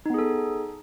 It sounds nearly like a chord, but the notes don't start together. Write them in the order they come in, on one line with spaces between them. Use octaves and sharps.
D#4 B3 G#4 A4